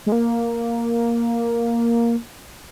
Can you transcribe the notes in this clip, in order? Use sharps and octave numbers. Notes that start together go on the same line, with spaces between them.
G#3
A#3